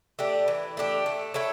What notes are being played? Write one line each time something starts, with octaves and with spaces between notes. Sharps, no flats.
A3 D4 G4
E3
A3 D4 G4
A3
E4 A4 C#5